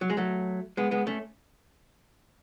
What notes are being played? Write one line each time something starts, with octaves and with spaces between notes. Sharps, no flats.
F#3
G#3
F#3 A3
G#3 B3
G#3 B3
A3 C#4